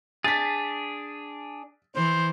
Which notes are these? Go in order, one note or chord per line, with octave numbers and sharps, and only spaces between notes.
D4 G#4 A6 B6
E3 C5